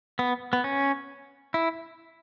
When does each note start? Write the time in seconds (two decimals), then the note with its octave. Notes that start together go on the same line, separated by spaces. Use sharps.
0.19 B3
0.53 B3
0.64 C#4
1.54 E4